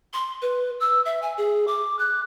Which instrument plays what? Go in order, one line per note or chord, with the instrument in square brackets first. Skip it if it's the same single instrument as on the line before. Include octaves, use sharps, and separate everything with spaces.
[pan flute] C6
B4
E6
E5
G#5
G#4
D6
F#6